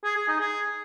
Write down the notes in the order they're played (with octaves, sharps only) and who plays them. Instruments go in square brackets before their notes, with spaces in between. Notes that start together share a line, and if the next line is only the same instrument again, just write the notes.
[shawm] G#4
G#4
D#4
G#4